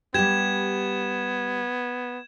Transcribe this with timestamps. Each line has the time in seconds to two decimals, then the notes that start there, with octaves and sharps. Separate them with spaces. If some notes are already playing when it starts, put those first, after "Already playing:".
0.14 G3 B3 G4 G#6 E7